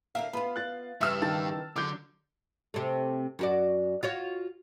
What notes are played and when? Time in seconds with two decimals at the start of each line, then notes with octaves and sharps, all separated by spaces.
0.15 D3 A#4 E5 F5
0.33 B3 F4 B5
0.56 F#6 A6
1.01 G2 C#3 E3 E5 E6 F6
1.22 D#3 A5 A6
1.76 D3 F#3 D6 G6
2.74 C3 A3
3.39 F#2 F#4 D5
4.03 F4 F#4 C#5